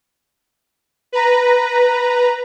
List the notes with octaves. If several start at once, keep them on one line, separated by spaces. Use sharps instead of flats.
B4 A#5